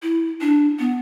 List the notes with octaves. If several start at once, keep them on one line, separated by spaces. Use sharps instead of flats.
E4
D4
B3